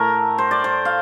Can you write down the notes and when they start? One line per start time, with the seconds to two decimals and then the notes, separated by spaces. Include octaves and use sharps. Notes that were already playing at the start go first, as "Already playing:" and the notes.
Already playing: A2 A3 A#4
0.38 C5
0.51 D5
0.64 C5
0.85 F5